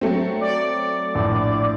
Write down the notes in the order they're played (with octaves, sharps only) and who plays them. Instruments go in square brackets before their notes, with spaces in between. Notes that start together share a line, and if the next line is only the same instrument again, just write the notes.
[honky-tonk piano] F#3 A3 C4
[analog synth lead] D5
[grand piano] A#1 A2